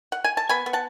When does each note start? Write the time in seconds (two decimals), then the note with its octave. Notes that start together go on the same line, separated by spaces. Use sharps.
0.12 F#5
0.24 G#5
0.37 A5
0.49 B3 G#5 B5
0.66 B3
0.73 F#5 A5